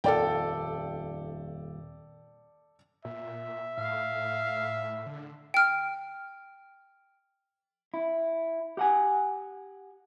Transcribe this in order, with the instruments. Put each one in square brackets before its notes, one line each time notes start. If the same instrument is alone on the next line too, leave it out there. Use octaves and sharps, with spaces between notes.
[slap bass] D#1 F2 [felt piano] A4 D5 G5
[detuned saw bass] A#2 [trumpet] E5
[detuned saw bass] A2 [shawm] F5
[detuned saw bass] D3
[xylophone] G5 F6
[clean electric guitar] E4
G4 F#5 G#5